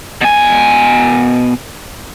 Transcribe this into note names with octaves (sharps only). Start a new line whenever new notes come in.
B2 G#5